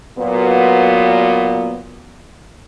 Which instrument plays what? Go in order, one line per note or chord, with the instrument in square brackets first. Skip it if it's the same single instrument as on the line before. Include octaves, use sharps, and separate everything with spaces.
[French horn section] A#2 F#3 B3